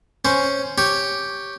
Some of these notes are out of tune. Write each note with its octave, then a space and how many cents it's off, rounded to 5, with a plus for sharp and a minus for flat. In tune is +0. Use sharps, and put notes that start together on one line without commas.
C#4 +0 C5 +0
G4 +0 C#5 +0